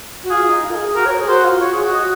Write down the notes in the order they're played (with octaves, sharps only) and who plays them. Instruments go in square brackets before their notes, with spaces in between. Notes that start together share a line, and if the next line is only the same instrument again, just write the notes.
[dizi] F#4
[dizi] F4 [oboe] G#4
[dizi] D#4
F4
A#4
G#4
G#4
[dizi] F#4 [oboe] A#4
[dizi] C#5
A#4
G#4
[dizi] F#4 [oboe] C5
[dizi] F4
[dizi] F#4 [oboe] C#5
[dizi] G#4
F#4
[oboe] D#5